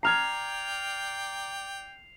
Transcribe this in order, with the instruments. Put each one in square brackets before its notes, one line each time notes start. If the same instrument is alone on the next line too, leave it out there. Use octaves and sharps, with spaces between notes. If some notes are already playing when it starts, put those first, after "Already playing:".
[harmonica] D5 G5 [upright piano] A#5 F6 G#6 [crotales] C7 F7